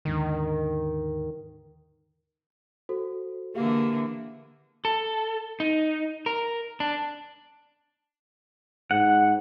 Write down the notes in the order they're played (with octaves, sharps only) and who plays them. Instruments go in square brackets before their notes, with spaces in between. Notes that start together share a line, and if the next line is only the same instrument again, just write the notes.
[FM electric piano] D#2 G#2 D3 [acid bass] D#3
[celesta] F#4 A4 C5
[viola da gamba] D3 E3 A#3 [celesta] G4 G#4 F5
[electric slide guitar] A4
D#4
A#4
D4
[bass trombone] G#2 [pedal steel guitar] F#5